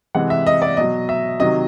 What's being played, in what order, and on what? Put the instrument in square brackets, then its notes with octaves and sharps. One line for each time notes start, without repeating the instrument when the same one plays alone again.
[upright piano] C3 E3 G#3 F#5
E5
D#5
D5
B2 F#3 D#5
E5
C3 D#3 F#3 D#5